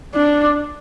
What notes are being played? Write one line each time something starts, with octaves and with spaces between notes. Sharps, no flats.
D4